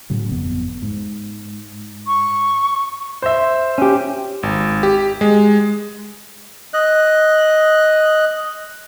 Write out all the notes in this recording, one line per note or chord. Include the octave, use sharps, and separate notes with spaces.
A2 C#3 F#3
G1 F2 B3
G#2
C#6
C5 E5
C#4 G4
G#1
G4
G#3
D#5 F#6